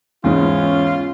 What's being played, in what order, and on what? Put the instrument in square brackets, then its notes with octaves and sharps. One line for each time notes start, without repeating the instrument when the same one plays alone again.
[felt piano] E2 G#2 [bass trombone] C#4 [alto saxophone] F4